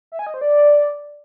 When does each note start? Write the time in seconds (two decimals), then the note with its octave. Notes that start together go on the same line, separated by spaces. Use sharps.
0.12 E5
0.19 G#5
0.27 D#5
0.34 C5
0.41 D5